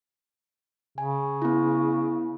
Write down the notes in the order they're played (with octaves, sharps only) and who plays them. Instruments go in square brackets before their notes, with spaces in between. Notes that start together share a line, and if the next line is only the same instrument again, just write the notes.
[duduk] C#3 [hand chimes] G#5
[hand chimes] B3 E4